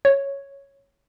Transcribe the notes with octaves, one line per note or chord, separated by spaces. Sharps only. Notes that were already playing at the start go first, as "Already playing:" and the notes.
C#5